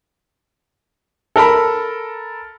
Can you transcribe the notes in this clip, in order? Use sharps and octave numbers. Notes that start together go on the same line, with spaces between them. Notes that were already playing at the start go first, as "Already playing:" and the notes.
A4 A#4 A5 B5